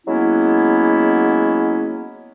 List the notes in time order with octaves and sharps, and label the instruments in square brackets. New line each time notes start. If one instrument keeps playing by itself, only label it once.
[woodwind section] F#3 G#3 A#3 B3 C#4 E4